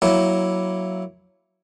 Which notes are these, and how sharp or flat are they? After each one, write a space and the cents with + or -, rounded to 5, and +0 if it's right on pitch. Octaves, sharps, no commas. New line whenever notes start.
F#3 +0 A#3 +0 E4 +0